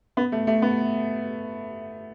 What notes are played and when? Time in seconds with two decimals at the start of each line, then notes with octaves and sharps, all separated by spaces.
0.17 B3
0.32 A3
0.47 A3
0.62 B3